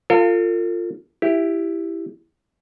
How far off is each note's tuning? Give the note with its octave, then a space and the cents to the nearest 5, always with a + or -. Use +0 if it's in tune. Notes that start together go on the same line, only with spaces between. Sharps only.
F4 +0 A4 +45
E4 +5 G4 +0